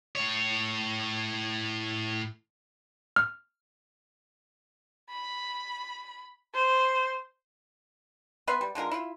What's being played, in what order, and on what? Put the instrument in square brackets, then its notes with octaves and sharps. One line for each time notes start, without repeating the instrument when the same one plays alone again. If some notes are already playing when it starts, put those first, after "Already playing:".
[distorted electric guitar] A2 C#5
[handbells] F6
[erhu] B5
C5
[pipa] B3 B4 E5 C6
G3
D3 G#3 F4 A#4
E4 F4